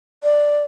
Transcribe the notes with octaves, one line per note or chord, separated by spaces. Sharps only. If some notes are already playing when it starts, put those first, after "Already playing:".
D5